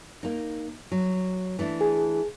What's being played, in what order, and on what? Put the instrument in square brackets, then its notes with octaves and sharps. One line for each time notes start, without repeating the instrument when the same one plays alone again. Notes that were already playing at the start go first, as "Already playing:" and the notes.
[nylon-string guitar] A#3 D#4
F#3
E3 A3 D4
[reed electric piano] G#4